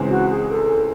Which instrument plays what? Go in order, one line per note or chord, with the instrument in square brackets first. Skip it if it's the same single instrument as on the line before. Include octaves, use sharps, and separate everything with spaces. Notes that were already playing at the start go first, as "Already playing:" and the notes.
Already playing: [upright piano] C#2 C#3 E3 G#3 C4
[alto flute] F#4
G#4
A4